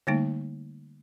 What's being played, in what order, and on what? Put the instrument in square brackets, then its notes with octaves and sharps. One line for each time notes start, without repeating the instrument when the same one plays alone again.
[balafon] D3 G3 A3 A#3 D#4